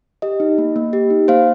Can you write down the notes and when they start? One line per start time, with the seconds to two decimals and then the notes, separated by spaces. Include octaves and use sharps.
0.22 G4 D#5
0.40 D#4
0.58 A#3
0.76 A#3
0.93 G4
1.10 D#4
1.28 A#3 C5 F5